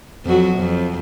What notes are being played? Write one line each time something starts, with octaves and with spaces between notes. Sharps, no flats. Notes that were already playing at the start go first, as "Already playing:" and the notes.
F2 F#3 F#4
F2